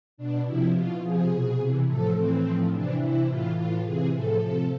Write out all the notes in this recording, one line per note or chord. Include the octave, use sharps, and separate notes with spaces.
B2 D4
C3 F3 E4
B2 F4
C3 F3 G#4
B2
C3 E3
A2 F3 A4
A2 E3 C4
A2 F3
C3 E3 D4
C3 E3 E4
A2 E3 F4
A2 E3 F4
C3 E3 G#4
A2 F3 A4
C3 F3 A4